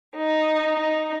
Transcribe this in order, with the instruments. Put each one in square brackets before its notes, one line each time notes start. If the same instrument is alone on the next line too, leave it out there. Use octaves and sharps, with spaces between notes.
[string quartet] D#4
D#4